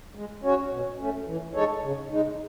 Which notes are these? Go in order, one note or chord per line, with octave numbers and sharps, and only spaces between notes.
G#3
C#4 F#4 C#5
B2
A3 C#4
E3
G#3 D#4 A4 C#5
C#3
G#3 D#4